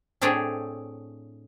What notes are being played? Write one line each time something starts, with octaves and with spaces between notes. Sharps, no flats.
A2 A3 C4 D4 G#4 C#5